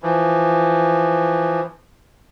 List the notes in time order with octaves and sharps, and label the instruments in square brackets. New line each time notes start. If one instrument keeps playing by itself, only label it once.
[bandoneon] E3 F3